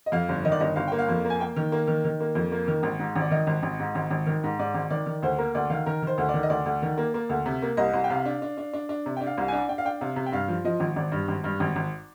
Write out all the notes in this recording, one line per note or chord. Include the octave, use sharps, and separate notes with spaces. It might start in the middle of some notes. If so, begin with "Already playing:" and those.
D#5
F2 F5
G1
D#3 D#5
D5
G1 D#5
G1 F5
A#3 G5
F5
F2
A#3
G#5
A#3 G5
D#3
A#3
D#3
D#3
A#3
F2
A#3
D#3
G#1
G#2
G#1
D5
D#3 D#5
G#1
G#1
G#2
G#1
G#1
D#3
G#2
G#2 D5
G#1
D#3 D5
D#3
D2 C5
A#3 A#4
D2 D5
D#3 F5
D#3 A#4
D#3 C5
D2
D5
D#3
D#5
D2 D5
D2
D#3
A#3
A#3
D2
C3
A#3
C2 D#5
C2
G5
C3 F5
D4
D4
D4
D4
D4
C3
D4 G5
F5
C2
D4 G#5
D4 G5
F5
D4 G5
C3 F5
C3
G5
G2 F5
F3
F3 D#5
G#1
G#1 D5
G2
G#1
G2
G#1
G#1